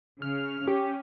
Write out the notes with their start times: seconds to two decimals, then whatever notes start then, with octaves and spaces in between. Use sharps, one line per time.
0.22 C#3 F6
0.68 C#4 G4